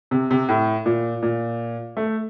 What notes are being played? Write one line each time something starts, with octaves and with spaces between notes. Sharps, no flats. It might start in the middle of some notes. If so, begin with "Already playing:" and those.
C3
C3
A2
A#2
A#2
A3